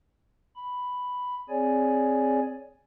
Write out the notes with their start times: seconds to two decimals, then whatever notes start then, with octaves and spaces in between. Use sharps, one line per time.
0.56 B5
1.49 C4 G#4 C#5 D5 G#5